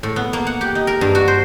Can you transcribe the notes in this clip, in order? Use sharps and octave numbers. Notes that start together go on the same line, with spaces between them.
A2
B3
A#3
F#5
G4
D#4
A#4
G2
F#4
C5